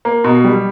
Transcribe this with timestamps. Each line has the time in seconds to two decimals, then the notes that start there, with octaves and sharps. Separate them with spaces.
0.05 A#3
0.24 B2
0.44 G3